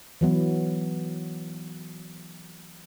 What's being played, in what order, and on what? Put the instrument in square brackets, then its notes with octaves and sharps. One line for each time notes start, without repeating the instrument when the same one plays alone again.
[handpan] E3 F#3 B3